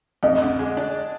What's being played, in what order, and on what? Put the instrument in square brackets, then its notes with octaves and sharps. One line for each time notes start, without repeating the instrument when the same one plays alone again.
[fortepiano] F2 [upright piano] D#5
[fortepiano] D3
G#3
D4